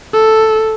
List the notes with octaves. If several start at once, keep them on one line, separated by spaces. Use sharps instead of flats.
A4